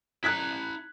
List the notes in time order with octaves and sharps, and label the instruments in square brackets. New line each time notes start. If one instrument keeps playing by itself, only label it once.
[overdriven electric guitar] E4 A#5 [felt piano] F#6 G#6 B6